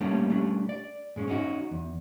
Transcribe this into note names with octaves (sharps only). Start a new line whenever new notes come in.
G3 A3 A#3 C#4 D4 G4
G3 A3 C#4 D4
D5
G#2 G#3 C#4
C#4 D#4 F#4
E2